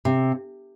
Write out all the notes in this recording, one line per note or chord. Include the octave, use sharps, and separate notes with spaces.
C3